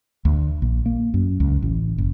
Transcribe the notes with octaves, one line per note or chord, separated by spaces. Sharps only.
D2
A#1
A#3
F#2
C#2
A1
F#1